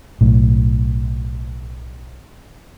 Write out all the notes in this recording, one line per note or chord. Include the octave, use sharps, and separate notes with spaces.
B1 A2